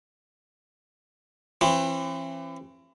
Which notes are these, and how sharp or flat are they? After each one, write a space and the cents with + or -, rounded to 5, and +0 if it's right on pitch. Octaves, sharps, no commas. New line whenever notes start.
E3 +35 C4 +45